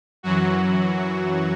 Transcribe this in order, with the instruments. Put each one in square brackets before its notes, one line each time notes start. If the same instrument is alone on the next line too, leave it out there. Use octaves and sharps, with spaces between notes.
[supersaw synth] F#2 E3 F#3 F#4